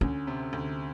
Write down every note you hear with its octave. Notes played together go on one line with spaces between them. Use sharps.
D2 C#4
C3
D2